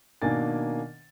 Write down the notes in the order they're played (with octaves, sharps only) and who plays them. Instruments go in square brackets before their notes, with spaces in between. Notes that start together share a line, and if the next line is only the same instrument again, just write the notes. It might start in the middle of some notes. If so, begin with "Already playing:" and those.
[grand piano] B2 D#3 A#3 D4 G#5 A6